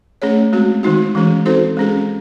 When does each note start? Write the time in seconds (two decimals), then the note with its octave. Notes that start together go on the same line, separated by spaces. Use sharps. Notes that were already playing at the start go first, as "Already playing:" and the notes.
0.22 A3 C#4 G#4 C#5
0.53 G#3 C4 F#4
0.83 D#3 G#3 D#4 F#4
1.15 E3 G#3 C#4 G#4
1.45 C4 D#4 F#4 A4 C5
1.77 G#3 C#4 G#4